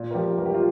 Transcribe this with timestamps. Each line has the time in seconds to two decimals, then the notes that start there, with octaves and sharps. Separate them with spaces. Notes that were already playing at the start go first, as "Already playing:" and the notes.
Already playing: A#2
0.11 A#4
0.14 F3 G4
0.38 C2 A#4
0.46 G4
0.54 F4